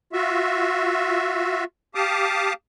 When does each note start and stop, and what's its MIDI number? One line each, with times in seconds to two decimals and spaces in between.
0.13 1.64 65
0.13 1.64 66
0.13 1.64 76
1.95 2.53 67
1.95 2.53 77
1.95 2.53 81
1.95 2.53 86
1.95 2.53 87